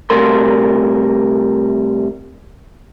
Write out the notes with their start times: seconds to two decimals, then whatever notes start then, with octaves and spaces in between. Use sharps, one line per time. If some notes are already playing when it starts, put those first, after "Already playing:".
0.10 C3 G3 A3 A#4 C6